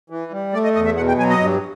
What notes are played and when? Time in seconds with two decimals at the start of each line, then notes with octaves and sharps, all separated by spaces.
0.10 E3
0.32 G3
0.54 A3 D5
0.64 D#5
0.75 E2 D#5
0.85 E5
0.97 B2 F#5
1.08 G5
1.18 F#3 G#5
1.30 D#5
1.40 G2